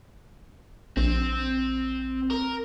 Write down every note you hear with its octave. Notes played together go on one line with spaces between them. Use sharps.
A#1 C4
A#4